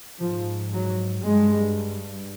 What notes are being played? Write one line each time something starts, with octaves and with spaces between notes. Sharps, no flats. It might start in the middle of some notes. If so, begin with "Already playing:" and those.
G#2 F3
F#3
G2 G#3